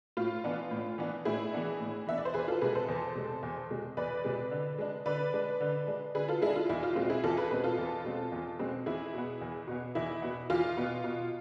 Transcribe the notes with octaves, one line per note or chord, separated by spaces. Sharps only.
A2 F4
E3 B3 D4
A2
E3 B3 D4
A2 E4 G#4
E3 B3 D4
A2
E3 B3 D4 E5
D5
C5
E2 G#4 B4
F4 A4
C3 G#3 G#4 B4
A4 C5
E2
C3 G#3
E2
C3 G#3
E2 B4 D5
C3 G#3
D3
G#3 D4
D3 B4 D5
G#3 D4
D3
G#3 D4
D3 G#4 B4
F4 A4
G#3 D4 E4 G#4
F4
E2 E4
F4
B2 G#3 C4 F4
E4 G#4
E2 F4 A4
G#4 B4
B2 G#3 C4 G#4 B4
F4 A4
E2
B2 G#3 C4
E2
B2 G#3 C4
E2 E4 G#4
B2 B3
E2
B2 B3
E2 E4
B2 B3
E2 F4
B2 B3
B2